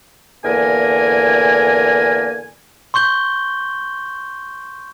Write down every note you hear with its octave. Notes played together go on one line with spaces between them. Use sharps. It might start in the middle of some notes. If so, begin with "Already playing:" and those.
E2 D3 A#3 A#4 G#5
C6 C#6 G6 G7